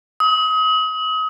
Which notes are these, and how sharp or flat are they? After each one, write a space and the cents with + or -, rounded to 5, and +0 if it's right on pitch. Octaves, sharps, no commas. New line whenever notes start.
D#6 +35